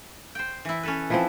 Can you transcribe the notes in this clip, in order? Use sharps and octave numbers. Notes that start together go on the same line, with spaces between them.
C5 G5
E3 E4
C#4 A4 B4
E3 F3 C4